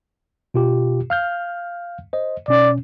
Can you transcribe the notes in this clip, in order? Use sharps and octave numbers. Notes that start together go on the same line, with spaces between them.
B2 F4 G4
F5 F6 G6
C5 D#5
B2 C#4 D5